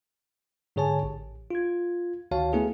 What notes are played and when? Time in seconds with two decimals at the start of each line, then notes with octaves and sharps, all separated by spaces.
0.76 G#2 D3 G#4 C#5 G#5 A5
1.03 A1
1.51 F4 G#6
2.31 D2 D#3 F#4 C#5 F5 A5
2.53 A3 B3 E4 G#4